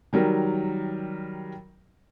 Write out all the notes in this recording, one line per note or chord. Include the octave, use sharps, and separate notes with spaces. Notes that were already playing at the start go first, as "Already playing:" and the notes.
D#3 F#3 G3 A#4